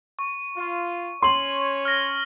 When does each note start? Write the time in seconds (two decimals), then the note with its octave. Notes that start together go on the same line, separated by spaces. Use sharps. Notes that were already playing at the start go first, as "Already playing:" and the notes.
0.19 C#6
0.55 F4
1.22 C#4 C#5 C6 C#6 F#7
1.85 F6 A#6